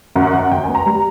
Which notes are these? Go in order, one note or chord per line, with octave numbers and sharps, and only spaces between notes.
F#2 F#5
F#5
F#2
F#5
F#2 G5
B3 G#5
A#5
G3